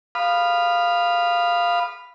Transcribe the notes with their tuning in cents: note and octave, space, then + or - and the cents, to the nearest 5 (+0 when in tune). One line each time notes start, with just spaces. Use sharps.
F5 +0 B5 +0 D#6 -25